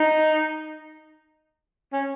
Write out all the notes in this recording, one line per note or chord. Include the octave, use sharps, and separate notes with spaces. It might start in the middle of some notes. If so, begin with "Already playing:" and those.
Already playing: D#4
C#4